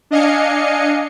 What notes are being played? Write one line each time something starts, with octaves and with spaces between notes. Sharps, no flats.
D4 D#5 F5 G#5 C#7